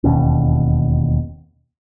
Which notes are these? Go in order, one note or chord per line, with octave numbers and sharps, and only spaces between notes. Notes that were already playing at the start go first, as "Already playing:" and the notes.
E1 D#2 B2 C#4